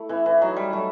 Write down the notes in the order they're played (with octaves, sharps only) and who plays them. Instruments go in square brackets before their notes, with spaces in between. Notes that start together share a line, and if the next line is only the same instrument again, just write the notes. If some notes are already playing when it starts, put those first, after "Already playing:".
Already playing: [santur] A3 E4
[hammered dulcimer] E3 [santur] E5
[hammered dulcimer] E3
[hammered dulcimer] F#3 [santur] D#4
[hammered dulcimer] G3
[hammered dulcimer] F#3 [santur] A3